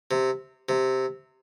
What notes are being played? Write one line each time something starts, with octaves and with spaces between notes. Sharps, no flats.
C3
C3